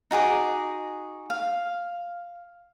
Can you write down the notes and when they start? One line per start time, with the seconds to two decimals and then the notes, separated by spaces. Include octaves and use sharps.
0.11 D#4 F#4 G#4 D6
1.30 F5